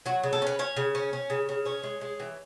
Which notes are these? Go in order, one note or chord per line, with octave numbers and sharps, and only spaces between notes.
F#3 F#4
C#3
A4
C#4 B4
C#4 C#5
C#3
C#4
C#4
C#3
C#3
C#4 C#5
G#3
G#3
E3